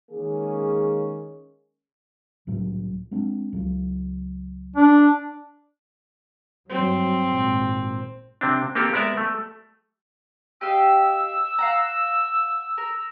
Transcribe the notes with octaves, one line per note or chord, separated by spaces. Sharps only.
D#3 G#3 A#3 C#4 G#4
C2 A2 F#3
G#3 C4 D4
C#2 F#3
D4
G2 F#3 C4
G#1 A#2
C3 C4 D4
A#3 C4 G4 A4
G#3 B3 A#4 D5 E5
A3
G4 D#5 F5 E6
F5 F#5 A#5
A#4